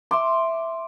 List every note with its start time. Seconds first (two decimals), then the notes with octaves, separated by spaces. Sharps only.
0.11 E5 C6 D6